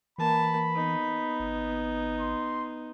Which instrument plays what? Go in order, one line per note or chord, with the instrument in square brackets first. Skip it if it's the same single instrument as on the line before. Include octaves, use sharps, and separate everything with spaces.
[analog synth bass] E3 [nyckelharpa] A#3 A5 [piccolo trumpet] B5
[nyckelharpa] B3 D#4
[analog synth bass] G#1
[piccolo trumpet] C6